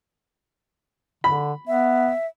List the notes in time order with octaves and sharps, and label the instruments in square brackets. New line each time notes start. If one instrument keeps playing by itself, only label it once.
[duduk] D3 [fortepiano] B5
[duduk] B3 [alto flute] E5